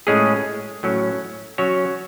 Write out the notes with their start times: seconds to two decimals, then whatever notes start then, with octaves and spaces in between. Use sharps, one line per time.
0.07 A2 G#3 C#4 G#4
0.83 A2 F#3 C#4
1.58 F#3 C#4 F#4 C#5